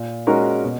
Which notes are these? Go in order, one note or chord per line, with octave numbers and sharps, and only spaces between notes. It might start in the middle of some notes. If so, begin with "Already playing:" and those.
Already playing: A#2
G#3 C#4 F#4 A#4
B2